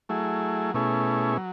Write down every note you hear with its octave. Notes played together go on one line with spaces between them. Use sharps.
F#3 A3 E4 G#4
B2 A3 C#4 E4 G#4
F#3